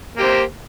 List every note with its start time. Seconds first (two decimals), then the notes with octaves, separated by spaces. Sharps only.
0.17 A#3
0.20 G4
0.22 C5